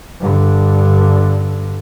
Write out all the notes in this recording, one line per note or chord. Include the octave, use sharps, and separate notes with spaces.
G2 D3